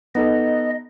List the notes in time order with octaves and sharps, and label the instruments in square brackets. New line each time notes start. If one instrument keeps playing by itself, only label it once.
[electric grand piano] B3 D#4 A4 [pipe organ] D#5